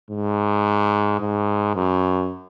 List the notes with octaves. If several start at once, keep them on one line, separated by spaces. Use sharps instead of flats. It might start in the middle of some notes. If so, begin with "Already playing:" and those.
G#2
G#2
F#2